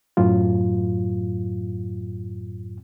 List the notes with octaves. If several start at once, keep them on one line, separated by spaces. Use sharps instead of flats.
F#2 A2 F#3 F4